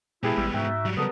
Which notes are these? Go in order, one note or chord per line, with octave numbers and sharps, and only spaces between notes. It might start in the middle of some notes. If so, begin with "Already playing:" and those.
A#2 G#3 B3 E4 G4 G#4 A5
A1 G3
G#2 D#4 F#4 E5 G5
F#3 G3
C#3 B3 A4 A#4 D#6